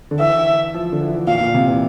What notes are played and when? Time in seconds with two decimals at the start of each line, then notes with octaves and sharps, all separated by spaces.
0.11 D3
0.20 E3 E5
0.74 F3
0.92 D3
1.01 E3
1.14 E3
1.27 A#2 F5
1.40 A#2
1.54 C3
1.67 E3